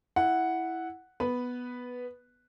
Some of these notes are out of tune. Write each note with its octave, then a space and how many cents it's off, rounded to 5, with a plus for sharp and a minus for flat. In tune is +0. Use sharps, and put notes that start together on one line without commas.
E4 +0 F#5 +0
B3 +0 B4 +0